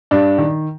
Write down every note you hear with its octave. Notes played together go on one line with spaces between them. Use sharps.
G2 D4
D#3